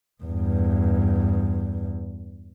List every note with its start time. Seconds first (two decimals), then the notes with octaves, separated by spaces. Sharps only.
0.23 E2 G2